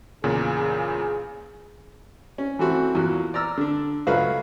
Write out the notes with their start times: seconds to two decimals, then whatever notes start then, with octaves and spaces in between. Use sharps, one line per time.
0.24 E2 A#2 C#3 G#4
2.38 C#4
2.59 E3 A3 C4 F#4 A4
2.95 E2 A#2 F#4
3.34 D5 A#5 E6 F6
3.57 D3 D4
4.07 C#2 F#3 A3 F#4 B4 F5